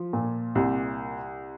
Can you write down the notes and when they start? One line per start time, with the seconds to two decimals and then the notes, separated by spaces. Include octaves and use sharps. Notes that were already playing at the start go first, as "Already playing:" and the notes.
Already playing: F3
0.13 A#2
0.55 C2